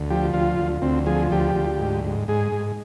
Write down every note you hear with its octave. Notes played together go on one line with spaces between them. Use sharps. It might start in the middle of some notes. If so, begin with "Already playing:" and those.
Already playing: D2
F3 G4
D2 F4
D2
D2 C4
F3 G#4
D2 G4
D2
G#2
G#2
G#2 G#4
G#2